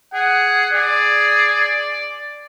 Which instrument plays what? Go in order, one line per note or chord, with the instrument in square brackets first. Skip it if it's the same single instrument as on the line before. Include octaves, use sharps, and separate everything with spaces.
[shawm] G#4 [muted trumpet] F#5
[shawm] G#4 [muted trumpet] D5